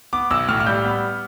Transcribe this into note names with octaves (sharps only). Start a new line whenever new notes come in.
B3 D6
B1 E6
A2 F6
F6
G3 G6
B3